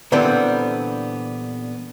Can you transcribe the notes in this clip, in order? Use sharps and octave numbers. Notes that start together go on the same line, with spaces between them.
A#2 D3 E3 G3 B3 C4